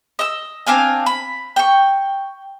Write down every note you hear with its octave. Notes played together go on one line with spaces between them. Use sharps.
D#5 E6
C4 D4 F5 G#5
B5
G5 C#6